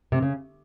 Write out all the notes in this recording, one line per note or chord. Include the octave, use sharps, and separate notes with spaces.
C3
C#3